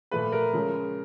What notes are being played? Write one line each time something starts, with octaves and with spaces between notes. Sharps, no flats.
A#2 F3 A3 B4
A#4
C#3 F3 G#3